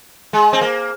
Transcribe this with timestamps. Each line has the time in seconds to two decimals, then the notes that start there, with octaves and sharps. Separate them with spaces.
0.33 G#3
0.53 C4
0.61 A#3